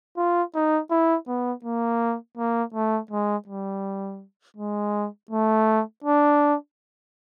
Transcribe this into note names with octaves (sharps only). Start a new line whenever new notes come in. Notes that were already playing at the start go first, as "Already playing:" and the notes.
F4
D#4
E4
B3
A#3
A#3
A3
G#3
G3
G#3
A3
D4